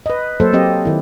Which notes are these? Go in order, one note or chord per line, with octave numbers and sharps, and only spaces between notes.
B4 D#5
F#3 A#3 A4 C5
F#3 C4 G4 D#5
D#3 E4